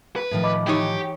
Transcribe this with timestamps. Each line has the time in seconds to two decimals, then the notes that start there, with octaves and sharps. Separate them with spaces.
0.16 B4
0.31 A2 D#3 F3
0.43 D#5 B5 D6
0.67 E3 D#4 G4 C#5